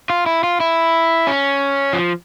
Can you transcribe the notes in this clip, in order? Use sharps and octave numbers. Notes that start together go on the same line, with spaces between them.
F4
E4
F4
E4
C#4
F3